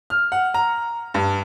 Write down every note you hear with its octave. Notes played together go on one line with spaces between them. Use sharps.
F6
F#5
A#5
G2